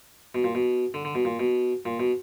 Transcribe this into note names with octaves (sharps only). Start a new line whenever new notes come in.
B2
A#2
B2
D3
D3
B2
A#2
B2
A#2
B2